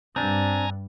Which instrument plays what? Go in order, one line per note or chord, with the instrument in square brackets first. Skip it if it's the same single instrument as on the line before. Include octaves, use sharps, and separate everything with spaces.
[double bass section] G2 [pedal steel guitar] C4 D4 [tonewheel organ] G#5 A#5